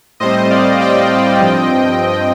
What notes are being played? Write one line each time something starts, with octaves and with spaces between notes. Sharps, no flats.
A2 G3 C4 C5 D#5
D5 F5
D#5 G5
G2 F3 C4